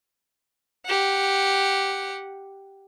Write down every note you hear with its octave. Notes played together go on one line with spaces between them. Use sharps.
G4 F#5